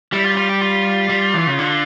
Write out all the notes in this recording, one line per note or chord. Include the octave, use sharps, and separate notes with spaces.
G3 E4
F4
F4
G4
F4
G3
E3
C#3
D3